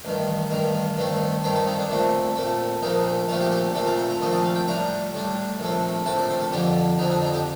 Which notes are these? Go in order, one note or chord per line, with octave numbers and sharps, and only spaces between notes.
A1 G2 D#3
A1 G2 D#3 A#4
G2 D#3 A3 C4
G2 D#3 A3 C4 A#4
A4
D#4
D4
A#2 A3 C4
A#2 A3 C4
A#1 A#2 A3 C4 D#4
A#1 A#2 A3 C4 F4
G4
G4
A#1 A#2 A3 C4 A4
A#4
C5
A#5
A#1 A#2 A3 C4 D#5
D5
F5
G5
A2 G3 D4 A#5
A2 G3 D4
A#1 A2 A3 C4
A#1 A2 A3 C4 A5
D5
C5
A4
F2 D3 F3 C4 G4
F2 D3 F3 C4 D#4
D4
D#4
G4